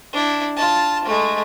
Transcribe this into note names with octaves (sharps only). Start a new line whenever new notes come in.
D4 E4
F4 A5
G#3 A3